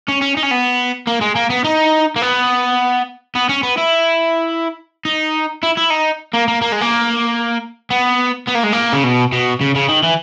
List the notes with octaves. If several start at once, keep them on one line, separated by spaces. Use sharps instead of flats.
C#4
C#4
D#4
C#4
B3
A#3
G#3
A#3
B3
D#4
A#3
B3
B3
C#4
B3
E4
D#4
E4
E4
D#4
A#3
A#3
A#3
G#3
A#3
B3
B3
A#3
G#3
A#3
C#3
B2
B2
C#3
C#3
D#3
E3